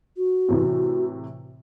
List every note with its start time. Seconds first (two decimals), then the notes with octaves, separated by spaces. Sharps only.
0.17 F#4
0.48 A2 C3 E3